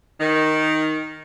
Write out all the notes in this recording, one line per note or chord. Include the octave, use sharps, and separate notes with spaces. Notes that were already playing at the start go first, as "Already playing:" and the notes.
D#3